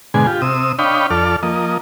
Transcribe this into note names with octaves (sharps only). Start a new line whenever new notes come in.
G#2 B2 D3 G#3 G#5
F4 G4
C3 D#6 E6
D4 C#5 D#5 F5 G5 B5
F2 A4 D5 F6
F3 A#3 D#5